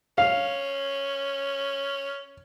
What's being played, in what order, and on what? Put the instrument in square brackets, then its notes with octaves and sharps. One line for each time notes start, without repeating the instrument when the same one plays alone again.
[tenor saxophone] C#4 [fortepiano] F5